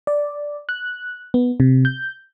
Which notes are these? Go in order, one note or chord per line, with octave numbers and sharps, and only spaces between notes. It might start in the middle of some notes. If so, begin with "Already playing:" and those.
D5
F#6
B3
C3
G6